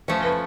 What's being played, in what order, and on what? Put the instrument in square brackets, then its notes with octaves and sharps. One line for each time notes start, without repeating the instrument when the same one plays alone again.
[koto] F3 A3 C#4 [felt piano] C5
[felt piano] B4